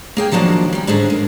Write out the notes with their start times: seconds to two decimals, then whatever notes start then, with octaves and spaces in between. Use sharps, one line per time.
0.17 A#3 G#4 G5
0.31 D#3 F3 F#3 A#3 D4
0.73 G3 C#4
0.87 G#2 D3 C#4 D4 G#4
1.10 A#3